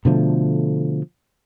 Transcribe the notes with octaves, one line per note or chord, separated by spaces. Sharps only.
B2 D3 F3 A3